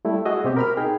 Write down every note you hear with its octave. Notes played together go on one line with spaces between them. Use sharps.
G3 A3 E4
F#4 G#4 D#5 E5
B2 C4 G4
A#4 B5 F6
D#4 G#4 G5